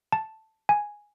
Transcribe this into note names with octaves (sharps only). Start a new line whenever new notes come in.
A5
G#5